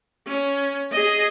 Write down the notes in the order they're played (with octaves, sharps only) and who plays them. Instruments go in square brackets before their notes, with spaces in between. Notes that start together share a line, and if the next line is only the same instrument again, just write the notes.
[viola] C#4
G#4 D#5